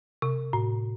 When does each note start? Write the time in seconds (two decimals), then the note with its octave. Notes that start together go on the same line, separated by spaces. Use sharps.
0.22 C3
0.53 A2